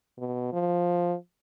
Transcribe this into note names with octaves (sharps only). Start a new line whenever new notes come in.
B2
F3